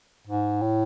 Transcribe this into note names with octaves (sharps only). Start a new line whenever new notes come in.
G#2
A2